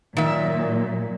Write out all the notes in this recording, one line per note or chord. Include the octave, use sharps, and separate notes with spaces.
A#2 D#3 F#3 E5